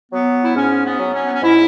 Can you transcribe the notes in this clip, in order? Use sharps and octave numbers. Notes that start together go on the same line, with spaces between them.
F#3 B3
E4
G#2 C#4
B3
F#3
C#4
B3
C#4
G#2 E4